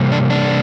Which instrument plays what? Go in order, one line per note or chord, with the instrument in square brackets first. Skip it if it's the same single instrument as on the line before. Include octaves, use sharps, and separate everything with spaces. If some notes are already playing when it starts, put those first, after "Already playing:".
Already playing: [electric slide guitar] C3 G3 A#3
D4
D4